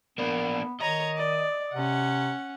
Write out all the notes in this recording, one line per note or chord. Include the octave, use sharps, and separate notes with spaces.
A#3 B3 D4
D#3 C#5 D#5 A#5
D5
C3 C#4 F#5